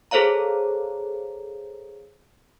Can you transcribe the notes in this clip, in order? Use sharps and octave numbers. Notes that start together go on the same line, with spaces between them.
G#4 A4 C5 C#5 F5 A#5